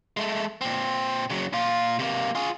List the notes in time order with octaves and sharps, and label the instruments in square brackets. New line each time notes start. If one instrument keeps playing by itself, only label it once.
[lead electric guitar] G#3 A3
A#2 C4
C#3 F#3
A#2 F4
C3 A#3
F4 G#4